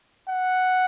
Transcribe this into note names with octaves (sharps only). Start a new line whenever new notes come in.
F#5